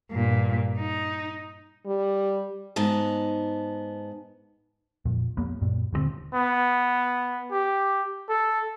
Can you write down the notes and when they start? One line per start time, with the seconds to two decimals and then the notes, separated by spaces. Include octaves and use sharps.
0.12 G2 A#2
0.78 D#4
1.86 G3
2.76 G#2 B3 D#4 A5
5.05 F2 A#2
5.37 F2 A#3 B3
5.62 F#2 A#2
5.93 D#1 G2 D3 C4
6.34 B3
7.51 G4
8.29 A4